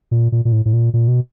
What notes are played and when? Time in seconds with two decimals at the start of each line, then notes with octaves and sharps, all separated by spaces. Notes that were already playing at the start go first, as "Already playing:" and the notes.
0.11 A#2
0.32 A#2
0.45 A#2
0.52 A2
0.65 A2
0.73 A#2
0.94 A#2
1.08 B2